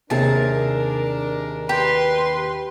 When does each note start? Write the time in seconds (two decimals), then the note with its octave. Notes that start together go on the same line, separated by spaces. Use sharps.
0.10 D#2 C3 D4 G#4 A#4 A5
1.69 G4 B4 C6